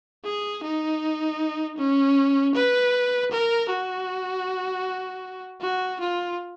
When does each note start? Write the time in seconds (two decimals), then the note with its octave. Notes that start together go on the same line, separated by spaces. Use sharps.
0.25 G#4
0.64 D#4
1.78 C#4
2.55 B4
3.31 A#4
3.70 F#4
5.61 F#4
6.00 F4